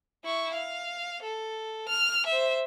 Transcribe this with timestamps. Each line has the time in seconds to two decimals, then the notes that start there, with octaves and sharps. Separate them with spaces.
0.25 E4 C#6
0.54 F5
1.22 A4
1.88 F6
2.26 C5 E5